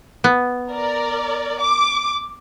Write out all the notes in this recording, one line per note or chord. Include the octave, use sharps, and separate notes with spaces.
B3
A#4 D5
D6